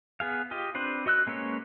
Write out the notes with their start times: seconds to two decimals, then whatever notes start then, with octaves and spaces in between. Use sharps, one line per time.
0.20 B3 G#4 F5
0.51 F4 G4 D#5
0.75 C4 D4 B4 C5
1.06 F#4 D#5 E6 F#6
1.27 G#3 A#3 C#4 B4 C#5